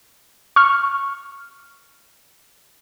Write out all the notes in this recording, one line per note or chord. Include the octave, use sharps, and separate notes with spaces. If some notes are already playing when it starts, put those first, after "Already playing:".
C#6 F6